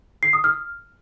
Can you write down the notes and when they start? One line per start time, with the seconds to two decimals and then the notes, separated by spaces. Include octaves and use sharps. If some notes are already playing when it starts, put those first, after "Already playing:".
0.23 C7
0.33 D#6
0.44 F6